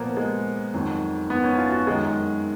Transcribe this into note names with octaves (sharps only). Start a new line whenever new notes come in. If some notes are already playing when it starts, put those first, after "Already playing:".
Already playing: A#2 F3 A#3 B3
G#3
F2 D#3 F#3
B3
C#4
F4
F#4
F#2 D#3 F#3 G#3